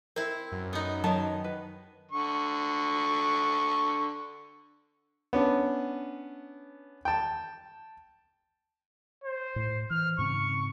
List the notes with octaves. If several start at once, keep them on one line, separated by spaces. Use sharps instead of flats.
C4 E4 A#4
F#2
B3 D#4
D#3 F#3 B3 C#5 D#5 A5
B4
D3 C#6
B3 C#4 D4
G5 A5
C5
A2
E3 F6
G#2 C#3 C4 C#6